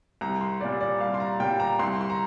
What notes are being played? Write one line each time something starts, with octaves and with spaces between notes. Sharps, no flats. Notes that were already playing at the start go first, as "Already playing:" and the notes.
C2 A#5
C6
A#2 G3 D5
D5
C2 F5
C6
A#5
A#2 G3 G5
A#5
C2 C6
C6
A#5